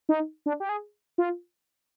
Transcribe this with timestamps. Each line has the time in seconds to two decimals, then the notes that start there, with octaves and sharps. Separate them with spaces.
0.09 D#4
0.46 D4
0.60 G4
0.69 G#4
1.18 F4